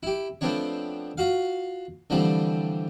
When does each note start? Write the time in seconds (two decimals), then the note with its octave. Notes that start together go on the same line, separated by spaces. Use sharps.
0.03 E4 G4
0.41 F3 A3 B3 C4 D4 C#5
1.18 F4 F#4 F5
2.10 D3 E3 F3 G3 A3 C4